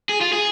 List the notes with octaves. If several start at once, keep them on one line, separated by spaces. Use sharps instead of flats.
G#4
F4
G#4